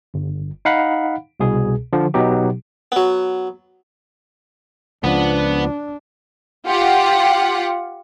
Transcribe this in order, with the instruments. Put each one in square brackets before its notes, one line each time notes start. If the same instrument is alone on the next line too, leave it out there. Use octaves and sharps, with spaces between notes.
[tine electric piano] G1
D#4 F5 F#5 B5
C2 B2 G#4
D3 F3
B2 F#3 B3 D#4 G4
[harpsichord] F#3 B3
[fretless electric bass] C#2 F3 [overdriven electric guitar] B3 [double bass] D4
[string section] F4 G4 F#5